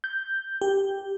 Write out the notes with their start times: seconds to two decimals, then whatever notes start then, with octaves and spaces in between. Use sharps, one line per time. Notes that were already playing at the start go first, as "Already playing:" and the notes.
0.04 G6
0.61 G4